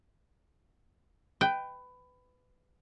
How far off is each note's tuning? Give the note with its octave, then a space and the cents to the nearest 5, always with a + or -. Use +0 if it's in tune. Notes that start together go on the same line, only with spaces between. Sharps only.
B4 +20 G5 +0